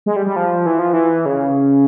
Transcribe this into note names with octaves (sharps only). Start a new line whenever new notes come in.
G#3
G3
G3
F3
E3
F3
E3
C#3